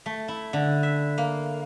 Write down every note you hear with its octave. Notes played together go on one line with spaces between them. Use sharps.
A3
E4
D3
E5
A#3